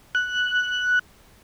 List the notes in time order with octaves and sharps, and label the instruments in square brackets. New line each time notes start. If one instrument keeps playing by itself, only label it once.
[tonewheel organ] F#6